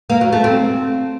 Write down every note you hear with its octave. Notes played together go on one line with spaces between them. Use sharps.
A#3
F#3
A3
C4